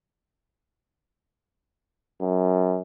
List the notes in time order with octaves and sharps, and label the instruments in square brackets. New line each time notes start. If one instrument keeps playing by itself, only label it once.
[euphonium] F#2